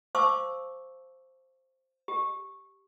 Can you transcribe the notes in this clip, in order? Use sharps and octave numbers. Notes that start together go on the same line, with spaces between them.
C5 F5 A5 C#6 D6 E6
G4